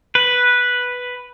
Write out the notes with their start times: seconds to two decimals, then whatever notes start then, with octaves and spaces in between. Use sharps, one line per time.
0.15 B4